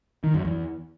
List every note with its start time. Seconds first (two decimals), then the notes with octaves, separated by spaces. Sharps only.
0.24 D#3
0.34 F#2
0.45 E2